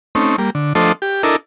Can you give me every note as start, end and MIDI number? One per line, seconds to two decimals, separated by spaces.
0.15 0.36 57
0.15 0.36 60
0.15 0.36 61
0.15 0.36 63
0.38 0.50 55
0.38 0.50 58
0.55 0.73 50
0.75 0.92 53
0.75 0.92 57
0.75 0.92 62
0.75 0.92 69
0.75 0.92 72
0.75 0.92 75
1.02 1.22 67
1.23 1.36 62
1.23 1.36 64
1.23 1.36 69
1.23 1.36 70
1.23 1.36 75